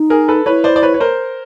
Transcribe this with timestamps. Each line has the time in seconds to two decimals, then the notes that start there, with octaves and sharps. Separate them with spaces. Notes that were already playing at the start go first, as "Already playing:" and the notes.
Already playing: D#4
0.10 G#4 A#4
0.28 A4 B4
0.46 E4 B4 C#5
0.64 C5 D5
0.76 D5
0.83 B4 C#5
0.94 C#5
1.00 A#4 C5